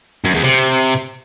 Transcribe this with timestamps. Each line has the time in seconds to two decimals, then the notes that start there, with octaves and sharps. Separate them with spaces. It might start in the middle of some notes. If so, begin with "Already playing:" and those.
0.25 F#2
0.34 E2
0.44 C3